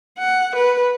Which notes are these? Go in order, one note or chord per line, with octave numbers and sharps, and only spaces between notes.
F#5
B4